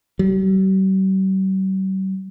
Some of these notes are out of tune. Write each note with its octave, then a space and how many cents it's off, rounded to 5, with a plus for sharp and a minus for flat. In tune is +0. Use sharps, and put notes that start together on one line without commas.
G3 -45